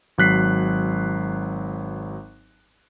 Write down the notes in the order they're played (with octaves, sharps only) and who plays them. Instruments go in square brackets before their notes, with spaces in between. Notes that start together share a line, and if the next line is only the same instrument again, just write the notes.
[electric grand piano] G#1 F#3 F#6 B6 C7